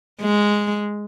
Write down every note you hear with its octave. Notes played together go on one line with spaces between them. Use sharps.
G#3